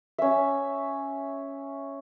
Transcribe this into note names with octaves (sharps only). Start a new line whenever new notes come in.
C#4 E5